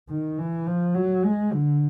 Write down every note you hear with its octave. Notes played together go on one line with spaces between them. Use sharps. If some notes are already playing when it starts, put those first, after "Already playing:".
D#3
E3
F3
F#3
G#3
D3